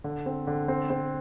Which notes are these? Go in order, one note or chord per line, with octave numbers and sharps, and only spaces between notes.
D3
C4
D3
C4
C4